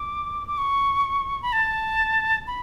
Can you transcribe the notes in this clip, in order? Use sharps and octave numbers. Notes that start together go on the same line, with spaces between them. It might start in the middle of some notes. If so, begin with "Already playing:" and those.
Already playing: D6
D6
C#6
B5
A5
B5